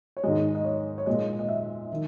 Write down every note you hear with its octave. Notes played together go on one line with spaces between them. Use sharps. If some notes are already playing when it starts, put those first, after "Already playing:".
C#5
G#2 D#3 G#3 D#5
D#5
C#5
C#5
A#2 G#3 D#5
D#5
E5
D#3